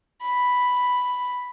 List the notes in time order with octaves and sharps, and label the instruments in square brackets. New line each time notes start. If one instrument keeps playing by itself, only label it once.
[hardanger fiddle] B5